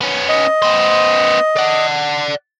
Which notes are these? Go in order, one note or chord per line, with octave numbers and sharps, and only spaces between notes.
B3 C#4
D#5
B3 C5
D5 F#5